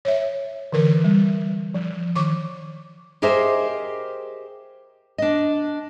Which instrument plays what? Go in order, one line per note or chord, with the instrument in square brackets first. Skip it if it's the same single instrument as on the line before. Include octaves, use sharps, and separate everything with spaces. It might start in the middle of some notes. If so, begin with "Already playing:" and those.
[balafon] C#5 E5
D3 E3 A#4 B4
G3
F3
D#3 C#6 D6
[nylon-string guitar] G4 G#4 A#4 C5 D#5 E5
D4 D#5